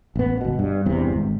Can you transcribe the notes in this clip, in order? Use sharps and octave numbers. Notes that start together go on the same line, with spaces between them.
A1 B3
G1 B2
G2
E2 G2 C3
G#1